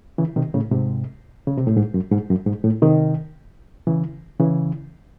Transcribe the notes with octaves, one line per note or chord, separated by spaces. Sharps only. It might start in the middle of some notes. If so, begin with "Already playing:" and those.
C#3 E3
C3 D#3
A2 C#3
G#2 C3
C#3
C3
A2
G#2
F#2
G#2
F#2
G#2
A2
C3 D#3
C#3 E3
C#3 E3